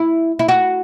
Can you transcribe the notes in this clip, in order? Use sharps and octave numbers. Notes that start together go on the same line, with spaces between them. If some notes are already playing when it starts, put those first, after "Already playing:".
Already playing: E4
E4
F#4